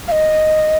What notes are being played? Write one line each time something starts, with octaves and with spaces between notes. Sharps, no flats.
F5
D#5